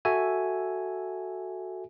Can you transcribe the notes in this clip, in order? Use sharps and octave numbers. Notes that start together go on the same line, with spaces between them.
F#4 A4 E5 G#5